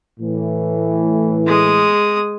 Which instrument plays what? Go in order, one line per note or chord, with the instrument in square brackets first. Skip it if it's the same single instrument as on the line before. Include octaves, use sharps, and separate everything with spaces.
[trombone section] A2 E3
[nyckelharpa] G#3 D#6